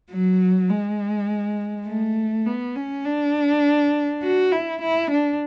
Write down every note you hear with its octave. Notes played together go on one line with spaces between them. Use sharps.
F#3
G#3
A3
B3
C#4
D4
F#4
E4
E4
D4